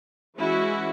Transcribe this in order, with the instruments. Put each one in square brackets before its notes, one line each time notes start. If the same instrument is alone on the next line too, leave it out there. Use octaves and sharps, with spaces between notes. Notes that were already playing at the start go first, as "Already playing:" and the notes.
[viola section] E3 G#3 C#4 E4 F#4